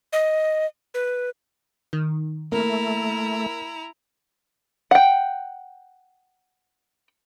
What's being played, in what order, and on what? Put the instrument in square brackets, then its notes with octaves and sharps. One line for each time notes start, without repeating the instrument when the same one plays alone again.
[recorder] D#5
B4
[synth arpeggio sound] D#3
[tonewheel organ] A3 [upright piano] A#3 [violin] E4 A#5
[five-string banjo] F#5 G5